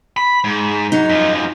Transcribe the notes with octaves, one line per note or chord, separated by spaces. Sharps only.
B5
G#2
F#3 D#4
F#2 F3